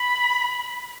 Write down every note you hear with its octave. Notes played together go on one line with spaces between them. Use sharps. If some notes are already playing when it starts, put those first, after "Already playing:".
Already playing: B5